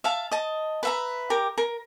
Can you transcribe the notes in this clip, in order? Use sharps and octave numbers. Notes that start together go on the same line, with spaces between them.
E5 F5 A5
D#5 A5
B4 E5 A#5
G4 A#4
A#4